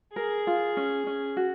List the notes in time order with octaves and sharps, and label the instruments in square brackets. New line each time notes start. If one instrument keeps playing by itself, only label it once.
[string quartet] G#4 [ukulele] A#4
[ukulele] F4
C#4
C#4
F#4